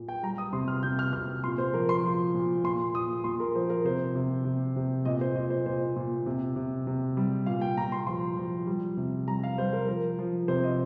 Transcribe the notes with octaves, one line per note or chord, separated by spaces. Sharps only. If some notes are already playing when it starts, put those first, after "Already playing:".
Already playing: A#2
G5
G3 A#5
D#6
C3 C6
F6
C3 G6
F6
C3 F6
A#2 C6
C5
F3 A#4
C6
F3
A#2
A#2 C6
A#2 D#6
A#2 C6
A#4
F3 C5
A#4
C3 C5
C3
C3
C3
A#2 D#5
C5
A#2 D#5
C5
A#2 C5
A#2
C3
C3
C3
G3
A#2 F5
G5
A#2 A#5
C6
F3 C6
F3
G3
C3
G3 A#5
F5
G3 C5
A#4
F3 A#4
F3
C3 C5
D#5